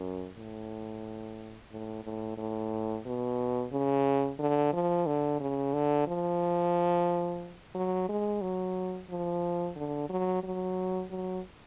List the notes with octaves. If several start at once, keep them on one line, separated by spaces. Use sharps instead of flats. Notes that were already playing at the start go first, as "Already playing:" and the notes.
Already playing: F#2
A2
A2
A2
A2
B2
C#3
D3
F3
D3
C#3
D3
F3
F#3
G#3
F#3
F3
D3
F#3
F#3
F#3